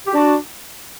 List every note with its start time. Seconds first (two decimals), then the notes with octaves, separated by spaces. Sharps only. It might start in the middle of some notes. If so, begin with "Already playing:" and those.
0.06 G4
0.13 D4 F#4